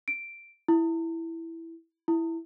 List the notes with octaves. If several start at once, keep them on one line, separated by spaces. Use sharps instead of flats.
D7
E4
E4